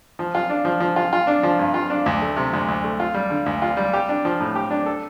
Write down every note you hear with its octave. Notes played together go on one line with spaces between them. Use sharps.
F3
F4
D4
F3
F3
F4
F4
D4
F3
G2
F4
D4
D2
A3
C3
D2
D2
A3
F4
G3
D3
D2
F4
G3
G4
D4
F3
A2
G4
D4
A4